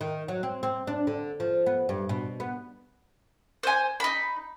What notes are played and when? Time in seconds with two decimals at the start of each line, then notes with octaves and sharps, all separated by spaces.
0.01 D#3
0.28 F#3
0.43 C4
0.63 C4
0.87 D4
1.07 D3
1.40 F3
1.66 B3
1.89 G2
2.09 B2
2.40 B3
3.63 C5 G#5
4.00 D#4 B5